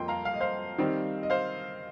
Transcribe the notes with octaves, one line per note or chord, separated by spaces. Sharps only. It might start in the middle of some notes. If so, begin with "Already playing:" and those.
Already playing: F2 F3 A#3 D#5 G5 C6
F5 A#5
F5
D#5
C5 F5
D#3 G3 C4 D#4
D#5
C5 F5